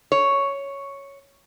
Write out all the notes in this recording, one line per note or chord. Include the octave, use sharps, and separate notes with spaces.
C#5